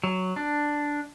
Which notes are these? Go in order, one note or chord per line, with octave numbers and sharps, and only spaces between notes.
F#3
D4